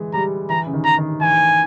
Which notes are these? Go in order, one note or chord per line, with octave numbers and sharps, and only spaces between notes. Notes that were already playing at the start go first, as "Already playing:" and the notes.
Already playing: E3 G#3
G3 A#5
E3 A#5
C#3
D#3
A#5
D#3
E3 G#5